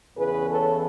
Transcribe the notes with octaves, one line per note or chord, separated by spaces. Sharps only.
E2 C#3 E3 G#4 B4
A4 C#5